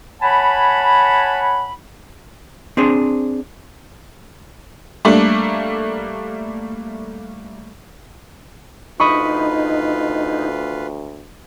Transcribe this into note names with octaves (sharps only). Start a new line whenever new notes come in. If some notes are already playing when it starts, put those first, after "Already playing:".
C#5 F#5 G#5 A5 B5
C4 D4 G#4 C5
G3 A3 A#3 D4
D2 D#4 F4 B4 D#5 B5 C#6